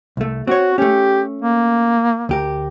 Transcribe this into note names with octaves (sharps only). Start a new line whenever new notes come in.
C2 A3
C4 F#4 C#5
A3 C#4 G4
A#3
D2 G4 A#4